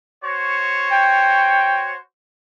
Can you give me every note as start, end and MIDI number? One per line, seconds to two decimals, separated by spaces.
0.24 1.97 66
0.24 1.97 72
0.24 1.97 73
0.92 1.88 79